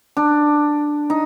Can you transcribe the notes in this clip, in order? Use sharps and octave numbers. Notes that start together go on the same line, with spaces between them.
D4
D#4